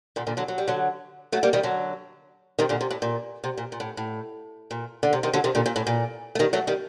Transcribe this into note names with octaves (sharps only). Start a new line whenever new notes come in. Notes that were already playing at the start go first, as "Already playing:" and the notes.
A#2 D3
A#2 D3
D3 F#3
F#3
G3
D3 F#3
F#3 A3
G3 A#3
D#3 G3
D3 F#3
C3 D#3
A#2 D3
C3
A2
A#2
C3
A#2
A#2
A2
A2
A#2
D3
C3
C3 D#3
D3 F#3
C3 D#3
A#2 D3
A#2
A2
A#2
A3
D#3 G3
F#3 A3
D#3 G3